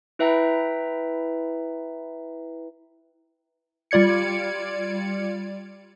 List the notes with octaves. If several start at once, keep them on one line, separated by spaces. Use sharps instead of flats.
E4 B4 E5 G5 A#5
G3 F4 D5 G#6 C#7